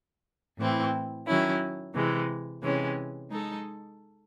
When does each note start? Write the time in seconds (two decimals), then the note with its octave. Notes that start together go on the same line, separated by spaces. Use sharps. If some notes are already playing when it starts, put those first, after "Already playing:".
0.58 A2 E3 C4 E4
1.27 D#3 F#3 C#4 E4
1.94 C3 E3 G#3
2.63 C3 E3 G#3 C#4
3.31 G#3 D#4 A4